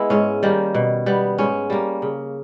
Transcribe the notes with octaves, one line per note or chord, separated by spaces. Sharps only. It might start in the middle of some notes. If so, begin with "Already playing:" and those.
Already playing: G#3 B3 E4 B4
G#2 C#4
D#3 G3 A#3
B2
G3 B3
G#2 C#4
G3 A#3
C#3